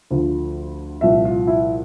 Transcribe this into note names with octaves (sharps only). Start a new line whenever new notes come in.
D2 D3 F3
C2 A#2 F3 E5
F4
E4